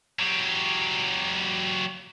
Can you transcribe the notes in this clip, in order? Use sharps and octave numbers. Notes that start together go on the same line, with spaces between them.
F#3 G4